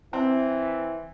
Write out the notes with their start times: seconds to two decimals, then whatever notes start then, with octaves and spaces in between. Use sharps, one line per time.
0.13 E3 C4